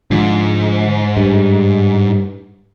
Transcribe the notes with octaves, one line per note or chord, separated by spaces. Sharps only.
G#2 D3 F3
G2